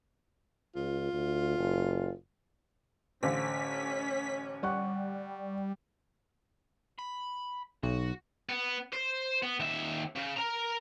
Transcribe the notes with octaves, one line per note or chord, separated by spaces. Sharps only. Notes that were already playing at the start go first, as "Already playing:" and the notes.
C#2 F4
D2
F#1
A1 D3 C#4 C5 F5 B6
G3 F#5 C#6 F#6
B5
B1 F#4
B3
C5
B3
D#2 E5
C#3
A#4 A#5